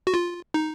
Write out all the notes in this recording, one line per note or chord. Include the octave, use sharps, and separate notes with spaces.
F#4
F4
D#4